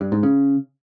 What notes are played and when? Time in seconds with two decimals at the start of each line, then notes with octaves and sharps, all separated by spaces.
0.01 G2
0.12 G#2
0.23 C#3